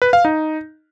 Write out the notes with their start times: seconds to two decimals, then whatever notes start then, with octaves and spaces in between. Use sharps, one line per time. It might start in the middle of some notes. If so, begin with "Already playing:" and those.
0.02 B4
0.13 F5
0.25 D#4